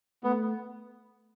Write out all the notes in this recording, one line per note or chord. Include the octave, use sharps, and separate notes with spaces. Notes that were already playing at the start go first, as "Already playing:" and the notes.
A3 B3